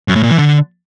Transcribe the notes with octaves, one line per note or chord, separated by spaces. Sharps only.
F#2
A2
A#2
E3
D3